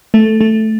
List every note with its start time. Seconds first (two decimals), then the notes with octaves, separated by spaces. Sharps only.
0.14 A3
0.41 A3